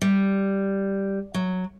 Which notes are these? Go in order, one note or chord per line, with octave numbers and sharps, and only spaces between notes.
G3
F#3